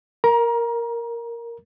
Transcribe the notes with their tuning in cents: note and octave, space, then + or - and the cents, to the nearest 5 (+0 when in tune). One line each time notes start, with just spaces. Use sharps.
A#4 +0 A#5 +25